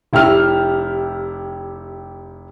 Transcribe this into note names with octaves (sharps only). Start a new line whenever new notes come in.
F1 E4 G4 E5 F6